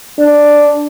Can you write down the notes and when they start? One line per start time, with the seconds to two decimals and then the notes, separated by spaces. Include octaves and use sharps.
0.19 D4